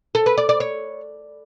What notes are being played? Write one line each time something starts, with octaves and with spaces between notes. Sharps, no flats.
A4
B4
D5
D5
C#5